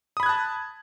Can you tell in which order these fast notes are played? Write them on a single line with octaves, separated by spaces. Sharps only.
D#6 B5 G#6 F#6 A5